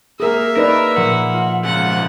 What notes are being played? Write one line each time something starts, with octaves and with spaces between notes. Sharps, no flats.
A#3 G#4 A#4 E5 D#6
D#4 A#4 B4 D5
A#2 F3 F#5
F4
G#2 C#3 F3 F#5